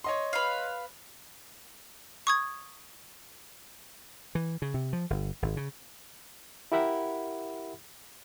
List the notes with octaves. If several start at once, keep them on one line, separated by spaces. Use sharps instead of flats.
C#5 D#5 C6
B4 F5
C#6 D#6 G#6
E3
C#3
C3
F3
G1
G#1
C#3
E4 G4 A#4 E5 F#5 B5